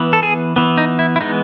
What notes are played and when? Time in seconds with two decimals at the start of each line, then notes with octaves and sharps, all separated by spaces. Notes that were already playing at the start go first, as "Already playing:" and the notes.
Already playing: E3 B3
0.13 A4
0.23 G#4
0.56 E3 B3
0.78 D#4
0.99 E4
1.16 E4
1.21 E3 G#3 B3 D#4